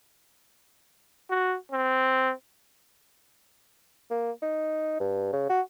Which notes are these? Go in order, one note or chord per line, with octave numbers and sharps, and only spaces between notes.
F#4
C4
A#3
D#4
G2
C#3
F#4